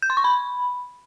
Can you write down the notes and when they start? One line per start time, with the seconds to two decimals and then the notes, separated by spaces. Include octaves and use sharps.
0.02 G6
0.10 C6
0.17 C#6
0.24 B5